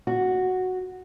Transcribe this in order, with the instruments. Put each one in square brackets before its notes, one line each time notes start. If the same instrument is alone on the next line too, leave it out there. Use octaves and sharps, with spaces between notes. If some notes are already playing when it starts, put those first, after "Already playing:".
[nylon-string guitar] F#4